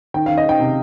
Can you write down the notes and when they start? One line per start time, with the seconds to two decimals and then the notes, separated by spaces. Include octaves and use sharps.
0.14 D#3 G5
0.26 D#3 F5
0.38 D#5
0.45 D#3 G5
0.60 C3